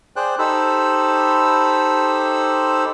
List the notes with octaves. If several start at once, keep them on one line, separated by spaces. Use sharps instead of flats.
G#4 C5 D5 G5 F#6
D#4 G4 A4 C5 B5 E6